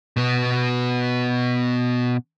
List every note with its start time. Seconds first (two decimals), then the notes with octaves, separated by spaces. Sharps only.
0.17 B2 B3